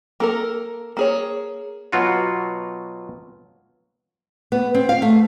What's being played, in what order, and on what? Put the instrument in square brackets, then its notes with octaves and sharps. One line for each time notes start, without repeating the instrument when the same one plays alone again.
[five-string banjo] A#3 A4 A#4
A#3 G#4 C#5
[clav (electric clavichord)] B2 F#3 F4 F#4
[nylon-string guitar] B3
C4
F5
A3